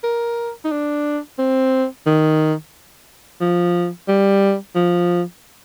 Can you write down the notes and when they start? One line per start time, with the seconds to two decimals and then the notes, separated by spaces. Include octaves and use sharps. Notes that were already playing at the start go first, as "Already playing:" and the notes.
0.04 A#4
0.64 D#4
0.71 D4
1.38 C4
2.06 D#3
3.41 F3
4.08 G3
4.75 F3